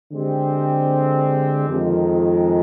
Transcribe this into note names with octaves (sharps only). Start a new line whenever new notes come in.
D3 G#3 C4 G4
F2 D#3 G#3